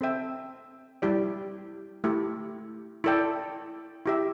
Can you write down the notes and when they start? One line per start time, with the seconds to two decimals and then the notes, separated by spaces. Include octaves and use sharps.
0.01 C4 A4 E5 G5
1.02 G3 E4 G4 D5
2.04 A3 E4 G4
3.04 E4 A4 D5 G5
4.06 E4 G4 E5